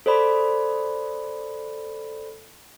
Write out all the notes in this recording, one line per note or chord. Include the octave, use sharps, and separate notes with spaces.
A4 C5 D5 B5